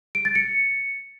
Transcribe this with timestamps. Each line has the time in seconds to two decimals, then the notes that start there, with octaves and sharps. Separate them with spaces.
0.15 D7
0.25 A6
0.35 C#7